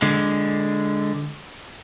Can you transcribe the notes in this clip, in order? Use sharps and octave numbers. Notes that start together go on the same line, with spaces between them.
D3 G#3